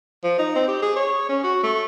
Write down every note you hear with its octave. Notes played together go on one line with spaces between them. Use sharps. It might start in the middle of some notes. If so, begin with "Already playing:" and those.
F3
D#4
C4
G4
G#4
C#5
C#4
F#4
A3